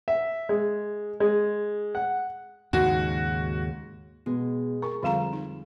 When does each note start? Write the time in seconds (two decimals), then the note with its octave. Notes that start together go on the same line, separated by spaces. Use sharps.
0.08 E5
0.49 G#3
1.20 G#3
1.95 F#5
2.73 D#2 G#2 C#3 F#4
4.26 B2 G#3
4.82 A#4 C#6
5.03 F2 D3 G3 F5 A#5 E7
5.33 D#4